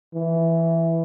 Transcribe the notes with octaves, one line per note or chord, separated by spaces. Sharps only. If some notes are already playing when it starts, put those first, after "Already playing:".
E3